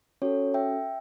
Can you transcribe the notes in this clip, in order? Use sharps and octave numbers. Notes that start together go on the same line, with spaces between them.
C#4 F#4 A4 C#5
E5 G5